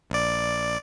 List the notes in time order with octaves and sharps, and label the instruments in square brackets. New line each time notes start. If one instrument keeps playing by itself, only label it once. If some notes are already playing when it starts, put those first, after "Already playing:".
[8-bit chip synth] A#1 D5